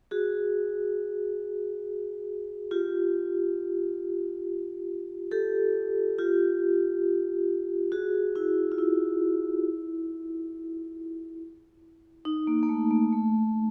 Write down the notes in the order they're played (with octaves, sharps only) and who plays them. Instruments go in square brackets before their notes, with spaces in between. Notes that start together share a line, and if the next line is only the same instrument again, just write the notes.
[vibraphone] F#4 G#4
F4 G4
G4 A4
F4 G4
F#4 G#4
E4 F#4
F4
E4
D#4
A#3
A#3
A3
A#3
A3